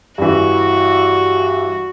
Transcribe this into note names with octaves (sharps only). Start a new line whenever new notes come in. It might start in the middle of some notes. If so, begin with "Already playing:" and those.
G2 E3 F#4